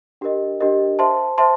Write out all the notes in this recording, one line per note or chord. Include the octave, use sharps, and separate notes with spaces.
D4 G4 A#4 D#5
D4 G4 A#4 D#5
C5 E5 A5 C6
C5 E5 A5 C6